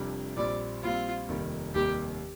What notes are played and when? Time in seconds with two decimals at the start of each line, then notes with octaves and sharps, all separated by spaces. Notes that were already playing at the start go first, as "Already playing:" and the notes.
Already playing: F1 F2 C3 G3 D4
0.37 A#1 A#2 G3 C4 D5
0.83 A#1 A#2 G3 C4 F4
1.28 F1 D#2 D#3 G3
1.74 F1 D#2 D#3 G3 G4